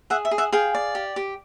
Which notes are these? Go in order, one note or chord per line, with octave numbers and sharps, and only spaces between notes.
G#4 E5 F#5
E5
G#4
E5 F#5
G#4 F5 G5
D5
G4
G4